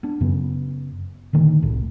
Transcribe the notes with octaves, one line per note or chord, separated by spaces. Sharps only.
B3 D4
F#2 C#3 B3
A#2 D3 D#3 A3
F1 C2 A2